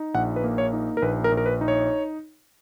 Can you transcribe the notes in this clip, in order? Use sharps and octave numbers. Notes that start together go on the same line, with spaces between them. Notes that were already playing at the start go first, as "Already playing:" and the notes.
Already playing: D#4
A#1 F#5
B4
A#3
C#5
D#4
A#4
A#1 B4
A#4
A#1
A#4
B4
D#4
C#5